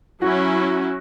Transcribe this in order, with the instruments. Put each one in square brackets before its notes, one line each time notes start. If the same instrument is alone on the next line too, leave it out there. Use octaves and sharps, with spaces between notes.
[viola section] F#3 C#4 E4 [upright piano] F#4